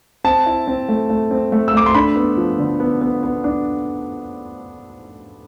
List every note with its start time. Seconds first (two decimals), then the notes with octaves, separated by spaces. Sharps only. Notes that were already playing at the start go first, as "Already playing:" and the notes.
0.24 C4 A5
0.46 E4
0.67 C4
0.89 A3
1.09 A3
1.31 C4
1.52 A3
1.68 E6
1.74 A3 D6
1.86 C6
1.94 D4 B5
2.16 B3
2.37 F3
2.59 D3
2.80 B3
3.01 B3
3.23 B3
3.44 D4